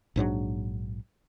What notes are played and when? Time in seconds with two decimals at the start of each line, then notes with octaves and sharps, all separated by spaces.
0.16 A#1 G#2 F#3 D4